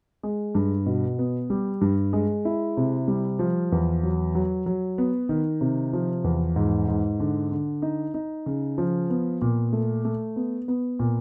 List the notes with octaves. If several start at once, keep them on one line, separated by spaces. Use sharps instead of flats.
G#3
G2
B2
B3
G3
G2
G#3
E4
C3
G3
F3
E2
F#3
F#3
F#3
B3
D#3
C3
F3
E2
G#2
G#2
D3
D3
D#4
D#4
C#3
F3
B3
A#2
A3
A3
B3
B3
A#2